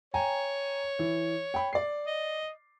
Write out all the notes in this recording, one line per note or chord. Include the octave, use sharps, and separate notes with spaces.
C#5 G5 G#5 A#5
E3
G5 B5
D5 C7
D#5